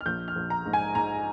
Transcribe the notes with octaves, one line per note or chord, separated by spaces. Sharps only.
F6
A#1 G6
F6
A#1
A#5
G#2
G#5
G#2 A#5